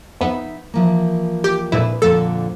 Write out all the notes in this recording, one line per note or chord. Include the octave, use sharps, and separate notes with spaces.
F2 B3 D#4 E5
E3 F3 A#3
G4
F2 A#2 D4 E4 G#4 B4
F2 A#2 D3 A4